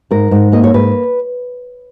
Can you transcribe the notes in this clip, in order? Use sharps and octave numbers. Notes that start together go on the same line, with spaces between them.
G#2 A#4
G#2
A#3 D#5
C#5
G#2 B4